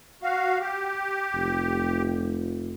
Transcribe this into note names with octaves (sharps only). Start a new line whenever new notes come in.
F#4 F5
G4
F1